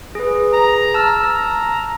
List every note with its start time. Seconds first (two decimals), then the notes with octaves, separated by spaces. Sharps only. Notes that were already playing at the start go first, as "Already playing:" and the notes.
0.15 G#4 B4
0.53 A#5
0.94 A5 E6 F6
1.23 A#5